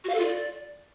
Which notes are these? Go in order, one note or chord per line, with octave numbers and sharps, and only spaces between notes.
F#4
F5
A4
F4
D5